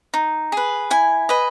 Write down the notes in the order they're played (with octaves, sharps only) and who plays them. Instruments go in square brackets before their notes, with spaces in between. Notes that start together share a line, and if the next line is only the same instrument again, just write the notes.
[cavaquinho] D#4
G#4 B4
E4 G#5
B4 D#5